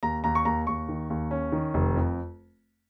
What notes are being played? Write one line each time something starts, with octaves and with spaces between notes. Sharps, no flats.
D#2 A#5
D#2 A#5
C#6
D#2 A#5
D#2 C#6
D#3
D#2
C#4
D#3
F1
F2